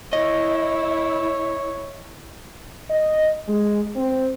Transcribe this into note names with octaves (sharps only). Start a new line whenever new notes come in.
E4 C#5 D#5
D#5
G#3
C4